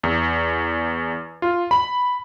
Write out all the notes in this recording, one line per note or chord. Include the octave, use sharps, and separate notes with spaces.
E2
F4
B5